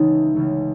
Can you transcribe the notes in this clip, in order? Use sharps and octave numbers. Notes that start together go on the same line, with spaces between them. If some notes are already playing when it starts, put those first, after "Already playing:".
Already playing: C#2 C#3 E3 A3 C#4 D#4
C#2 C#3 E3 A3